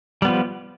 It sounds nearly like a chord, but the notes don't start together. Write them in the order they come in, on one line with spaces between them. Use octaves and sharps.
G3 B3 F3